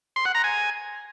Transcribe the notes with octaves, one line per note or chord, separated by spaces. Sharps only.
C6
F#5
A#5
G#5